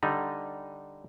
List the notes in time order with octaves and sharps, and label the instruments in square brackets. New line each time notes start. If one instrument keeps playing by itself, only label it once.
[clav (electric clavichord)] D3 G3 D#4